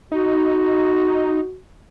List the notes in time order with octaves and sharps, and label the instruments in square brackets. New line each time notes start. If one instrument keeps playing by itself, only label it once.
[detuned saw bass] D#4 [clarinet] F#4